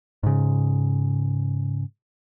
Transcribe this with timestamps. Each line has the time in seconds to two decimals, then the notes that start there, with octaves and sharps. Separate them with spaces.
0.23 G#2 C#3